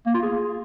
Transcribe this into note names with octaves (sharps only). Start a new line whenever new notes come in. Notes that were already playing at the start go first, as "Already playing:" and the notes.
A#3
F4
G#4